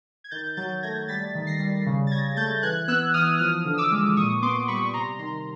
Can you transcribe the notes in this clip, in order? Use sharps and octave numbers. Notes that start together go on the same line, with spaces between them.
G#6
D#3 G6 A6
F#3 G6 A6
A3 G#6 A#6
G3 A6 B6
D#3
A#6 C7
G3
C#3
A6
C#3 G#6 A#6
A3 G6 A6
E3 F#6 G#6
B3 E6 F#6
E3 D#6 F6
F3 D#6 F6
D3
D6 E6
G#3
A#2 C#6 D#6
B3 C6 D6
G3 B5 C#6
C#6
C3 A#5 C6
D#3 A#5 C6